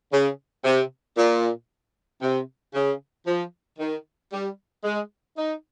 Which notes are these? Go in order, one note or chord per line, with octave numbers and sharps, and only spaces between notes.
C#3
C3
A#2
C3
C#3
F3
D#3
G3
G#3
D#4